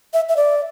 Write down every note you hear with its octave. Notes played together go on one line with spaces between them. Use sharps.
E5
E5
D5